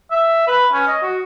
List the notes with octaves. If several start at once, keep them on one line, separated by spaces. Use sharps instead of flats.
E5
B4
C#4
D#5
F#4